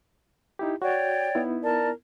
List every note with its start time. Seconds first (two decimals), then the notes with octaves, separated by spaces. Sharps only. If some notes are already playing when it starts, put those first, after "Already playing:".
0.59 D#4 E4 G4
0.82 F#4 C#5 D5 G5
1.35 B3 D#4 E4
1.63 A#4 D5 A5